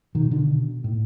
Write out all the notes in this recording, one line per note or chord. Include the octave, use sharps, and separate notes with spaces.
B2 D#3
D3
B2
A2